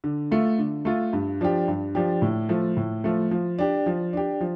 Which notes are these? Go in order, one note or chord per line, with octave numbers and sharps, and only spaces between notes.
D3
A3 F4
D3
A3 F4
G2
F3 D4 G4
G2
F3 D4 G4
A2
F3 A3
A2
F3 A3
F3
D4 G4
F3
D4 G4
F3